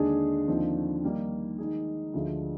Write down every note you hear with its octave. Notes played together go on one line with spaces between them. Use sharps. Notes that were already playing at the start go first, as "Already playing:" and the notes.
Already playing: D#2 D3 G#3 D4 G#4
D#2 D3 F3 C4 D#4
D#3 G3 A#3 D#4
D#3 G#3 D#4 G#4
D2 D3 F3 G#3